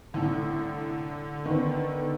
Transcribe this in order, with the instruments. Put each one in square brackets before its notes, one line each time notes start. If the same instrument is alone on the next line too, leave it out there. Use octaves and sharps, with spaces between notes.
[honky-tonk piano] C2 A2 [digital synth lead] D3
[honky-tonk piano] D#3 B3